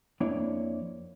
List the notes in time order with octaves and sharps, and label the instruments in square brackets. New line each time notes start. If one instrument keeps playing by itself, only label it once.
[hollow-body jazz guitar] F2 A#3 D4 E4 C#5 D5